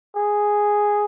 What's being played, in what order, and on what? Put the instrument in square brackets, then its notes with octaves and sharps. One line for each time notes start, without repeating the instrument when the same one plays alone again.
[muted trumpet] G#4